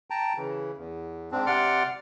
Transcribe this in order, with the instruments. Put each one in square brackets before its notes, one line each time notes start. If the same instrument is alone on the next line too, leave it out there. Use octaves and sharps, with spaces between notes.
[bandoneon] G5 A5 A#5
C#3 E3
E2
G#2 C4 D4
C3 D5 F#5 C6 D6 F6